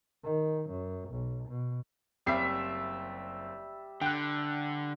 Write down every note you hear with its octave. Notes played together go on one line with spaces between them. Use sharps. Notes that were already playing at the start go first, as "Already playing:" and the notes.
D#3
F#2
B1
B2
F#1 G3 C4 E5 C7
D3 G5 F#6